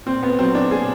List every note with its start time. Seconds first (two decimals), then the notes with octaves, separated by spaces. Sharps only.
0.06 A#2 C4
0.23 B3
0.39 F#3 C4
0.55 D4
0.71 A#2 G#4